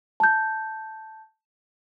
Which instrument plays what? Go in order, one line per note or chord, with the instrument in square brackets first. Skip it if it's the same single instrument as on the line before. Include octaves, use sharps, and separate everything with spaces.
[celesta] A5 G6